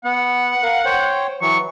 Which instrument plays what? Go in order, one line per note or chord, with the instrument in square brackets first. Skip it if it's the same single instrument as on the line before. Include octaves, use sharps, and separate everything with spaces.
[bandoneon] B3 [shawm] F#5
[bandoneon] A#4 F5
C5 C#5 G5
[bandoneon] E3 F#3 [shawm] C#6